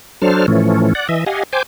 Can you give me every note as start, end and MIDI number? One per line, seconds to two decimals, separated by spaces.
0.22 0.46 54
0.22 0.46 62
0.22 0.46 69
0.22 0.46 72
0.22 0.46 89
0.48 0.93 45
0.48 0.93 52
0.48 0.93 53
0.48 0.93 57
0.48 0.93 61
0.95 1.07 74
0.95 1.07 78
1.09 1.24 52
1.09 1.24 75
1.09 1.24 76
1.26 1.43 67
1.26 1.43 75
1.26 1.43 77
1.26 1.43 78
1.26 1.43 80
1.53 1.63 72
1.53 1.63 79
1.53 1.63 80
1.53 1.63 86